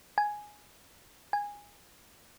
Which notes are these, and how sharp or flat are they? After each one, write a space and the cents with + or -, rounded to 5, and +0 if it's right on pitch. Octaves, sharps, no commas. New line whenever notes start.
G#5 +5
G#5 -15